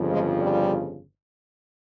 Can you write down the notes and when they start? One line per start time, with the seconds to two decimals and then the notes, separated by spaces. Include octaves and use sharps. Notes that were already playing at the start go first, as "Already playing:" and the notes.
Already playing: G1 F2 C#3 F3
0.12 G#3
0.40 G3